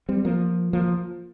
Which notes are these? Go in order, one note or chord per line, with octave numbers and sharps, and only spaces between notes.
G3 C4
F3 A#3
F3 A#3